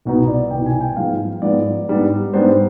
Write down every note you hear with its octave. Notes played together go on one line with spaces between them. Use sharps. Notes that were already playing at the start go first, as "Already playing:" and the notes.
C2 B2 B3 D#4
D5
C2 B2 B3 D#4 G5
G#5
G5
G#2 F3 G#3 B3 F5
G#2 F3 G#3 B3 D5
G#2 G3 B3 D4
G#2 G3 B3 D4 C5